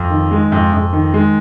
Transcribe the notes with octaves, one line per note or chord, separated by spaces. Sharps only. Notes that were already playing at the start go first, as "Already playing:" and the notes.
Already playing: F2
D#3
G#3
F2
F2
D#3
G#3